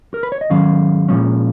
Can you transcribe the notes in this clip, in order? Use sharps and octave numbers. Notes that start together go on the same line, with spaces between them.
A#4
B4
C#5
D#5
G#2 D#3 F#3 C#4 F5
A#2 F3 G#3 C#4